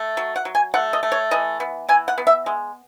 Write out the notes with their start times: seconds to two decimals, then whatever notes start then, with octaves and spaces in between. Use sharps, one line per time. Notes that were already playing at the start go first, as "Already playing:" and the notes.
Already playing: A3
0.17 F#3
0.36 F#5
0.45 F#3
0.55 G#5
0.74 A3 F#5
0.93 D#5
1.03 A3
1.12 C#5
1.31 E3 D#5
1.60 B3
1.89 E3 G#5
2.08 F#5
2.18 B3
2.27 E5
2.46 G#3